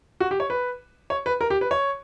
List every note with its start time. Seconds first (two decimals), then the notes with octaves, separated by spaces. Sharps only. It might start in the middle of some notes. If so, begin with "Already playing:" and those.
0.20 F#4
0.31 G4
0.40 C#5
0.50 B4
1.10 C#5
1.26 B4
1.41 A#4
1.50 G4
1.61 B4
1.71 C#5